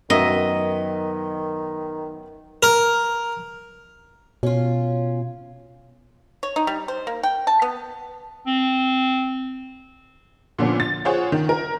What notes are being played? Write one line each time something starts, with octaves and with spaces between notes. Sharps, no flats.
F#2 D#3 F#3 B3 D#5 E5 A#5
A#4
B2 C#4 F4
C#5
D#4
G3
C5
A#3
G5
A5
B3
C4
A#2 D3 F3 B3 C#4
A6
F4 G#4 C5 C#5 F#5
D#3
A#4